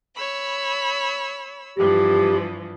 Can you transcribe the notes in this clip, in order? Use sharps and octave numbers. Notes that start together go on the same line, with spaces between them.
C#5 B5 E6
G2 E3 F3 G4